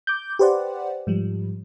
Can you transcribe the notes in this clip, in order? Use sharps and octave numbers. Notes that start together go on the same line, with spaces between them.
D6 G6
G4 B4 C5 D5 F#5
G#2 F3 G3